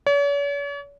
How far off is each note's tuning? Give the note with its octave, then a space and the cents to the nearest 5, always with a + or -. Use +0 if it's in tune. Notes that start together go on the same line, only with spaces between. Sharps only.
C#5 +45